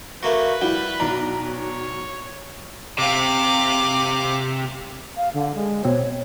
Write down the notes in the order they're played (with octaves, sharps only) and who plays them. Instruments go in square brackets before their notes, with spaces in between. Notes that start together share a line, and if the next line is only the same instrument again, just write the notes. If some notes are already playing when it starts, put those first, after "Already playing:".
[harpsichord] A3 A#3 F#4 [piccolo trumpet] B4
[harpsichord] G3 [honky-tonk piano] E4 F#4
[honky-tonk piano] B1 A#5 [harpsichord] D4
[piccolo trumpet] C#5
[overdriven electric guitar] C3 [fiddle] F5 D6
[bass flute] F5
D3
G#3
[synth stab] B2 C4 [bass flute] C#5